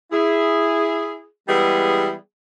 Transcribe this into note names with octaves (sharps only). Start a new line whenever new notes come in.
E4 G#4
E3 G3 G#3 B3 E4 G#4